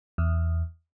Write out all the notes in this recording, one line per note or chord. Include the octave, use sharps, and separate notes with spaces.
E2